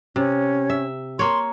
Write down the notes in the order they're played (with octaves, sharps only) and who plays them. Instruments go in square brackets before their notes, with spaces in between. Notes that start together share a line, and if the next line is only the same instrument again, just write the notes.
[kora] C3 [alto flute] C#4
[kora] E5
[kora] A#3 C#5 [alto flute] C6